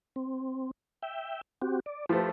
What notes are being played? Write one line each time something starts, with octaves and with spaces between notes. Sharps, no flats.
C4
E5 G5
C4 F#4 G4
D5
F3 A3 G4 B4 C5